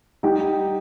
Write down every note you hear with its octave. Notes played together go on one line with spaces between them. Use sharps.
G3 D#4 G4